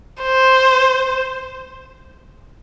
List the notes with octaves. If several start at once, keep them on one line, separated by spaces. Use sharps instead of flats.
C5